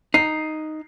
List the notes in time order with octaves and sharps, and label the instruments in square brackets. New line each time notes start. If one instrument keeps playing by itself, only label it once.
[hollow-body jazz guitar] D#4 [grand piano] C7